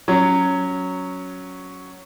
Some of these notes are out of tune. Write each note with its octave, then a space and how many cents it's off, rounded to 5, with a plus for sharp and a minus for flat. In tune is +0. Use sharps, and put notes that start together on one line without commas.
F#3 +0 C#4 +0